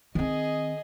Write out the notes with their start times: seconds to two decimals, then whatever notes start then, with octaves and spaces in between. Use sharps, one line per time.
0.15 D#3 C4 G#4 D#5